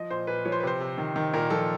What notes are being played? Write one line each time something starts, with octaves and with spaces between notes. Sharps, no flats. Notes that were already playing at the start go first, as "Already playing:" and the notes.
Already playing: F3 D#5
A#2 C5
A#2 B4
F3 C#5
C5
B4
C3 C5
C3
D#3
D#3
A#2 A#4
F3 A4